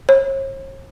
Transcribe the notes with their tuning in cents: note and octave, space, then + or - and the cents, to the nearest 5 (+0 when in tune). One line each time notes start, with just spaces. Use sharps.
C#5 -45